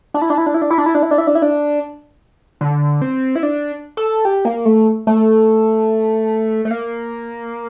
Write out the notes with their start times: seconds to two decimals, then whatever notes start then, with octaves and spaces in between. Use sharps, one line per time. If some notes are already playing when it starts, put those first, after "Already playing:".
0.14 D4
0.22 E4
0.30 D4
0.38 E4
0.46 D4
0.54 E4
0.62 D4
0.70 E4
0.78 D4
0.86 E4
0.95 D4
1.03 E4
1.11 D4
1.18 E4
1.27 D4
1.35 E4
1.42 D4
2.61 D3
3.02 C4
3.36 E4
3.43 D4
3.97 A4
4.25 G4
4.45 A#3
4.65 A3
5.07 A3
6.65 A3
6.71 A#3